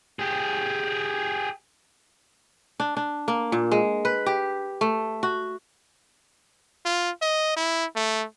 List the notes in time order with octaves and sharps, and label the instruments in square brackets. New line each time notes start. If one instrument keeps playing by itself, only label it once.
[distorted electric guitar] G4 G#4
[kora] D4
D4
A#3
A#2
G#3
B4
G4
A3
F#4
[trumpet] F4
D#5
E4
A3